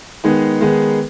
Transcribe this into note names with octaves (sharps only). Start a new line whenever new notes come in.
D#3 G#3 B3 D#4 G#4
D#3 G#3 B3 D#4 G#4